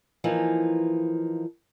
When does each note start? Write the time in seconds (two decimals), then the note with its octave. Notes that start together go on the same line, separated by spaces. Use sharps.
0.24 E3 F3 A#3 D#4